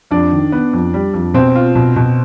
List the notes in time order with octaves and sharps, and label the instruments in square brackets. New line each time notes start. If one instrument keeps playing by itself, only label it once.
[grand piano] F2 [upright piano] D4
[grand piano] D#3
B3
F2
G3
F2
[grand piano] B2 [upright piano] C4
[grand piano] F4
B2
B2